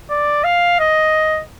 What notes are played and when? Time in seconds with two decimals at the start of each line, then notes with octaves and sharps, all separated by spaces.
0.10 D5
0.44 F5
0.80 D#5